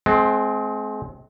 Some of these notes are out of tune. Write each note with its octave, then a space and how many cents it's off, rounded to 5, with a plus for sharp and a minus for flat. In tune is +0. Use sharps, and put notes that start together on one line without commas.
G#3 +35 C4 +0